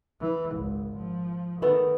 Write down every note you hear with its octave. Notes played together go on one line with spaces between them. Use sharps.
E3
G#1 C#2
F3
D#3 A3 B3 A4